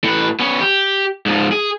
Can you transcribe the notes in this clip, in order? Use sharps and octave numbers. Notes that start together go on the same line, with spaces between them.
A2 B4
B3 C#4
G4
G#2 F3
G#4